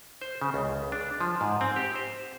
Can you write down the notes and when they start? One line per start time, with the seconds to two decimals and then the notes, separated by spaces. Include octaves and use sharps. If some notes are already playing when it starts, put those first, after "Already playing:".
0.22 C5
0.42 C#3
0.54 C#2
0.92 D4
1.21 F3
1.41 G#2
1.61 C4
1.76 G4
1.95 C5